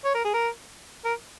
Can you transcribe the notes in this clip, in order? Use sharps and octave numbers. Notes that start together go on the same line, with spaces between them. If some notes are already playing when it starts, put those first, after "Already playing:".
C#5
A#4
G#4
A#4
A#4